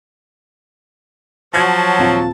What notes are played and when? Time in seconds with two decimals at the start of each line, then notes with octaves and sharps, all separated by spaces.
1.54 F3 F#3 A5 G#6 A6
1.98 D#1 C4 F4